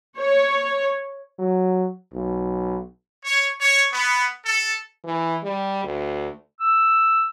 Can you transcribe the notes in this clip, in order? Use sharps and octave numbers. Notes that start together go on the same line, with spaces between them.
C#5
F#3
B1
C#5
C#5
B3
A4
E3
G3
D2
E6